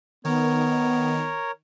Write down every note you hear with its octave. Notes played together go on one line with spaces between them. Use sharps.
D#3 B3 A#4 C#5